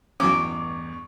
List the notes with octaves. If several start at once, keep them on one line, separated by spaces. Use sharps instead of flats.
A1 E2 G2 F#3 C#4 C#6 D6